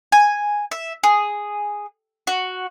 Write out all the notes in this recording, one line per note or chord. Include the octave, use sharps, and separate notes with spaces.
G#5
E5
G#4
F#4